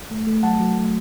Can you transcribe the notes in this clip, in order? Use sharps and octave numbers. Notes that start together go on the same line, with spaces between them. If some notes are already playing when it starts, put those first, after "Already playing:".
A3
A3
F#3 F#5 A5
F#3
A3